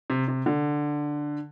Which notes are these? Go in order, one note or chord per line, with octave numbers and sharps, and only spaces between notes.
C3
C3
D3